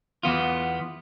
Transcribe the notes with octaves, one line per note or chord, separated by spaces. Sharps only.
E2 B3 F4